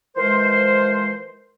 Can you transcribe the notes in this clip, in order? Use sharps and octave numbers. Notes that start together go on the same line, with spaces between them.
E3 F3 G#3 A#4 C5